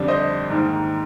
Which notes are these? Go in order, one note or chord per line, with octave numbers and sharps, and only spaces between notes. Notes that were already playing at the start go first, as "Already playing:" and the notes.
Already playing: F2 D3 G3 D4
C5 D#5
G#2 D#3 A#3